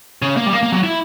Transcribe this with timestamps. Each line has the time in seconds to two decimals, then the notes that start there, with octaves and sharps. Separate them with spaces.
0.22 C#3
0.37 A#3
0.46 G3
0.53 A#3
0.63 A#3
0.72 F#3
0.84 E4